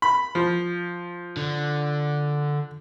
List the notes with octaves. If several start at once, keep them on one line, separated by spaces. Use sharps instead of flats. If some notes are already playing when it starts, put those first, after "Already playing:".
B5
F3
D3